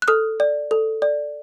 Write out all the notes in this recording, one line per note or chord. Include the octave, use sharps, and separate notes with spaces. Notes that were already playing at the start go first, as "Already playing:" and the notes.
F#6
A4 D#6 F6
D5
A4
D5